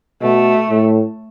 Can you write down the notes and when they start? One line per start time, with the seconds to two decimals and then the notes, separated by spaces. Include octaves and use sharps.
0.22 B2 A3
0.69 A2